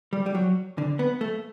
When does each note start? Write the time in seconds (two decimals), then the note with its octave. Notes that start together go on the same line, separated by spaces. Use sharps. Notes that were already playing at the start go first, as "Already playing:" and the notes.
0.13 G3
0.26 G3
0.35 F#3
0.78 D3
0.99 B3
1.21 A3